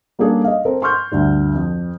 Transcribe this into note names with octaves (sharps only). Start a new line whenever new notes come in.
G3 A#3 C#4 D4 G#4 A4
D#5 F5
C4 A4 A#4 C5
C6 C#6 F6 G6
D2 G2 D3
F2